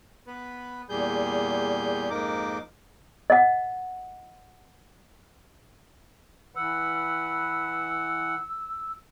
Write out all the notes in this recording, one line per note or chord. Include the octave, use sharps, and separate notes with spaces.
B3 B4
E2 A#2 G3 G#4 G6
F2 G#2 A#3 D#4 A#4 D6
D#5 F#5
E3 B4 F#5 E6